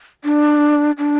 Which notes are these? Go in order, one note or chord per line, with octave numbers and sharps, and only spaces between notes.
D4
D4